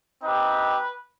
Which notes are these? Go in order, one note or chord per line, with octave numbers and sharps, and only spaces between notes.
C4 D#4 G4 B4